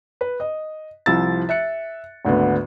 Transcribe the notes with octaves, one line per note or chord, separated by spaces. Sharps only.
B4
D#5
C2 F3 E4 E6 A6
E5 F#6 C#7
G#1 D2 D3 B3